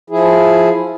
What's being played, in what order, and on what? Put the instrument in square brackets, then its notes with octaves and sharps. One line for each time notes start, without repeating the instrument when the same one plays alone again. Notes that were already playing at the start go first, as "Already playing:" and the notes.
[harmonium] F3 E4 G#4